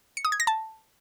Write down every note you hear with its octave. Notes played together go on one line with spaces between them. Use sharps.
C#7
D#6
G#6
A#6
A5